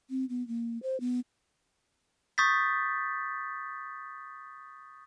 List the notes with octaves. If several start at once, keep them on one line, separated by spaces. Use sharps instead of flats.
C4
B3
A#3
C5
B3
C#6 D#6 G6 A6 B6